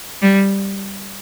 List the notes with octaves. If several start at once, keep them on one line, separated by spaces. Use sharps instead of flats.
G3